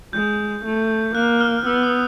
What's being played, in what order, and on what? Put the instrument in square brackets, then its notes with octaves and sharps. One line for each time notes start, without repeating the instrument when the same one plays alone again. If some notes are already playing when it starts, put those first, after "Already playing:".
[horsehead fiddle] G#3 [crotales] G6
[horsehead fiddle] A3
[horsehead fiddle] A#3 [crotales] F#6
[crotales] F6
[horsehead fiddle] B3 [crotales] E6
[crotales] D#6